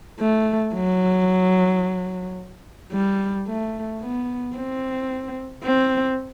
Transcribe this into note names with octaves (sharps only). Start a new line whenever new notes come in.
A3
F#3
G3
A3
B3
C4
C4